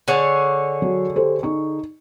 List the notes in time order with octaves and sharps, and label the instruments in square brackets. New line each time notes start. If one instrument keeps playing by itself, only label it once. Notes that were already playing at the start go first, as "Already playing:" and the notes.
[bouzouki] D3 G#4 C#5
[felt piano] F#3
G4 A4 C5
D#4 C#6